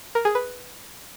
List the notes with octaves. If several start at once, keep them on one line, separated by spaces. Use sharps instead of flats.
A#4
G#4
B4